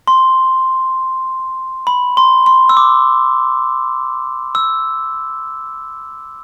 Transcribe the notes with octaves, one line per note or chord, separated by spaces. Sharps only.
C6
B5
C6
C6
E6
D6
E6